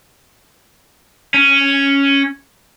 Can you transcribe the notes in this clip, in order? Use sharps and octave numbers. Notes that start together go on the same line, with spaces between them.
C#4